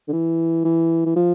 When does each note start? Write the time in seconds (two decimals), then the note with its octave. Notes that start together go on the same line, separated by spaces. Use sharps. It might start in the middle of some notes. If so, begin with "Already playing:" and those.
0.08 D3
0.13 E3
0.65 E3
1.06 E3
1.16 F3